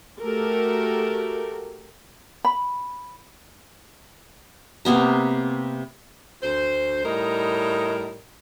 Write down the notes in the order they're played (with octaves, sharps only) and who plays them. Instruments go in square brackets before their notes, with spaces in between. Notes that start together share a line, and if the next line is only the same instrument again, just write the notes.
[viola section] A3 F#4 G4 A4 A#4
[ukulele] B5
[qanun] C3 A#3 B3 A#5
[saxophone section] D2 C5
A2 G3 D#4 A#4 D#5